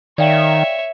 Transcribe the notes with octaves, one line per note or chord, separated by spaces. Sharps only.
D#3 C#5 D5 E5 F5 G5